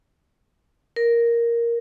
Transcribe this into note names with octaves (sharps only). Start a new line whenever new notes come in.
A#4